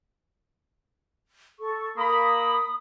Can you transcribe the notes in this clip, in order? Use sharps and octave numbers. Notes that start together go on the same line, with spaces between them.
A4 C#6
A#3 B5 D#6